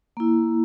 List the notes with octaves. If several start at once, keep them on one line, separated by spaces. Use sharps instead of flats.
A#3 E4